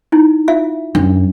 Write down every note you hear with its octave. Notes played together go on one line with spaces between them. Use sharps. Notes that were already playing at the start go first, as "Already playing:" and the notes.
D#4 E4
F4 E5 F5
F#2 D4